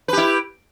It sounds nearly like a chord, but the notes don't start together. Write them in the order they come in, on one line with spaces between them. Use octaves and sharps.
B4 G4 E4